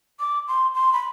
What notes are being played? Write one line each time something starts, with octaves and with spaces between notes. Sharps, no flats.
D6
C6
C6
B5